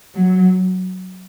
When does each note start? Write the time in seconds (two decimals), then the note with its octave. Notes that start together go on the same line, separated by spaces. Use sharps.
0.15 F#3